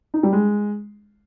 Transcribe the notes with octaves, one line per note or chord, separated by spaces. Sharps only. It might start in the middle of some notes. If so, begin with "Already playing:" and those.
D#4
G3
G#3